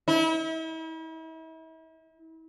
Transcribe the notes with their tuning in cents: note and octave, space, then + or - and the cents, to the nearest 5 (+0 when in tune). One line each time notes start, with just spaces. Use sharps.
E4 -40